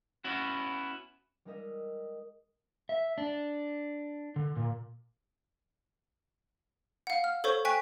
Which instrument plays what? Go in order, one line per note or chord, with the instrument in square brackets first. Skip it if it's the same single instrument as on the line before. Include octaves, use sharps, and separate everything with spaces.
[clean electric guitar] B3 C#4 E4 F#4
[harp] G3 G#3 D#4 A#4 D#5 E5
[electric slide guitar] E5
D4
D3
A#2
[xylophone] F5 F#5
F6
A4 C5 C#5 C#6
G5 G#5 C#6 F#6 B6